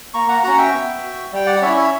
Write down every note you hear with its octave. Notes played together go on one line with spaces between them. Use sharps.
A#3 A#5 C#6
F#5 A#5
C#4 F#4 F#5 A#5
E5 G5
B3
F#4
G3 G5
D5 F#5
C#4 E4 C#5 E5
C#5 E5